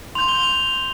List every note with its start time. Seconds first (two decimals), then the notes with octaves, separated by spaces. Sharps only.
0.15 C6 G6 F7
0.28 G7
0.43 F7